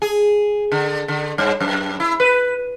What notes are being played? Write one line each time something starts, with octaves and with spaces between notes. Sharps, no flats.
G#4
D3
D3
G2
F#2
E4
B4